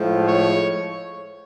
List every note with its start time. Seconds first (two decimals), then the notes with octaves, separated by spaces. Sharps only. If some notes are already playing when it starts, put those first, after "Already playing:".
Already playing: A2 F3 G#3
0.27 C#5